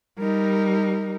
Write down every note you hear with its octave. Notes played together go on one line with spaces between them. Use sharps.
G3 D#4 A#4